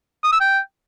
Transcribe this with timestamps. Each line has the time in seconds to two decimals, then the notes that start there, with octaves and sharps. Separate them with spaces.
0.24 D#6
0.32 E6
0.41 G5